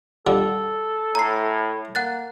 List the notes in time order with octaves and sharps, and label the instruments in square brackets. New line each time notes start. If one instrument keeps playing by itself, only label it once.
[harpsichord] A#2 D3 G3 [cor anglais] A4
[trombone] A2 [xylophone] A#5 C7
[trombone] A#3 [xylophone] F#5 F#6 A6